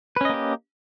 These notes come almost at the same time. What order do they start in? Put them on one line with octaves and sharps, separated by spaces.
B4 C#4 D#5 A#3 G4